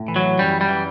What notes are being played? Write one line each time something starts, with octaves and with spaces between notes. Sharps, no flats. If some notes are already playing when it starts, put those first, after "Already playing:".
Already playing: A2
E3
F#3
F#2 G3
G3
E3